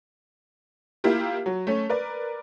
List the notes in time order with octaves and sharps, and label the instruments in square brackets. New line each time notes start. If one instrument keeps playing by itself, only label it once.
[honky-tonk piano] A#3 E4 F4 G4
F#3
A3 C#4
A#4 B4 D5